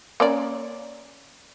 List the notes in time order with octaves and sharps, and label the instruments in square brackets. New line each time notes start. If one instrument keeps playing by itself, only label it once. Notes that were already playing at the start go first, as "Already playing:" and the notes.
[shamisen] A#3 C#4 D5